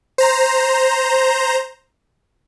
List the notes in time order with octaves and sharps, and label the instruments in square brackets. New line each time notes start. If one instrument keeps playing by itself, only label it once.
[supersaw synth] C5 A#5